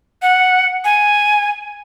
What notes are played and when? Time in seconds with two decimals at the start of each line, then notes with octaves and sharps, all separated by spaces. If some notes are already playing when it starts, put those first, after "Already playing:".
0.22 F#5
0.85 G#5